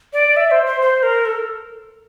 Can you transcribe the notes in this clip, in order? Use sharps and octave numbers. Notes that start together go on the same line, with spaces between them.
D5
E5
C5
C5
C5
A#4
A4